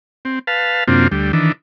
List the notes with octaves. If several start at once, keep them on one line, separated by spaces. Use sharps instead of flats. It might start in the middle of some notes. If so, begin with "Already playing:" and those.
C4
B4 F5 A5
F#2 C3 A#3 C4 D4 F4
D2 G3
D#3 E3 D4